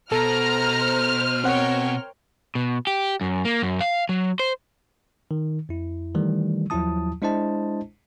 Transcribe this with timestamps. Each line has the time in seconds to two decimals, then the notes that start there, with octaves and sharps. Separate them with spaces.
0.12 B2 A4 C5 A#5 F6
1.44 C4 A#4 C#5 F#5 G5
2.55 B2
2.87 G4
3.21 F#2
3.45 A#3
3.63 F#2
3.81 F5
4.09 F#3
4.40 C5
5.31 D#3
5.69 F2 E4
6.15 D#3 E3 G3 A3
6.70 D#2 F3 F#3 E4 A5 D#6
7.22 G#3 D4 E4 C5 D#5 A5